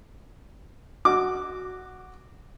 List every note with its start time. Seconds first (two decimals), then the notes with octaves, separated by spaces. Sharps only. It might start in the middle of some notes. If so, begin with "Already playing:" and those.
1.05 F#4 D6